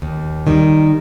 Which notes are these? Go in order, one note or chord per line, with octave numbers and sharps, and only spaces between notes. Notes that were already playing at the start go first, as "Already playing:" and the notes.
D#2
D#3 G3